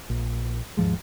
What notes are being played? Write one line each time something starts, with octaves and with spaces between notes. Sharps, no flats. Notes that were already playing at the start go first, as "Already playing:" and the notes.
A#1
D#2 G#2 F3 G#3